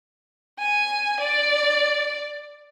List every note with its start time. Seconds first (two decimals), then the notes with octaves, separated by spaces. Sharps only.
0.59 G#5
1.20 D5